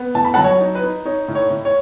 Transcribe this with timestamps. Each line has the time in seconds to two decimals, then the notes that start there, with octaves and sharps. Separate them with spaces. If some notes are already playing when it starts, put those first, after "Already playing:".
Already playing: B3
0.15 A2 A5
0.25 B5
0.34 F#3 F#5 A5
0.44 C#5
0.60 D#4
0.75 B4
0.83 D#4
1.05 D#4 C#5
1.28 A2
1.35 C#5
1.50 A2
1.65 C#5